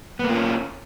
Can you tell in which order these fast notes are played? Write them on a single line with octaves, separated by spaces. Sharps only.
B3 A#3 F4 C#4